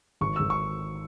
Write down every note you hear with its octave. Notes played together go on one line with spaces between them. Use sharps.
G#1 C#6
G#1 E6
C#6